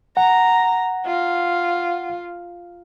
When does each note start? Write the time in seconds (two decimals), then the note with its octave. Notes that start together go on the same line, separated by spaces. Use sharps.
0.17 F#5 A#5
1.06 F4